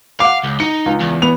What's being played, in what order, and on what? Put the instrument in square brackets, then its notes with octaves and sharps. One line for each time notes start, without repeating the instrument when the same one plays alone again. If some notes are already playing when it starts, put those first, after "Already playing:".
[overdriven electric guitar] F5 [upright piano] F#5 D6
[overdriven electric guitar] C#2
[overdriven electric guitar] D#4 [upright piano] C#7
[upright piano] C#2
[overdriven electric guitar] E2
[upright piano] B3 F7